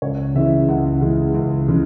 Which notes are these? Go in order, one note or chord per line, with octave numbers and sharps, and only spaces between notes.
C#2 C#5
C#3 E3 G#3 E5
C#2 F#5
C#3 E3 G#3
C#2
C#3 E3 G#3